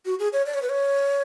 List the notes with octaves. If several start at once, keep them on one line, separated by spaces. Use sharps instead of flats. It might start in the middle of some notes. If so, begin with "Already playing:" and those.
F#4
G#4
C#5
D5
C#5
B4
C#5